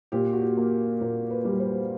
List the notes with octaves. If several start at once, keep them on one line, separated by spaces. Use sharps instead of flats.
A#2 G4
F#4
G4
A#3
A#2 A#4
B4
G3
C5